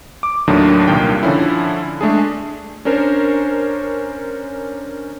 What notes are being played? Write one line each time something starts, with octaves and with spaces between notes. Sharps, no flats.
D6
D#2 A2 D3 D#3 F#3 D4
C2 G2 A#2 D#3 F4 G5
D3 F3 C#4 E4
G#3 A3 D4 G#4
C#4 D4 A#4 C5 C#5